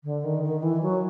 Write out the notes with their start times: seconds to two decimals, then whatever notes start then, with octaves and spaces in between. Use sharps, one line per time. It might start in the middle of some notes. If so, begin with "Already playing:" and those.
0.04 D3
0.24 D#3
0.43 D#3
0.63 E3
0.82 F#3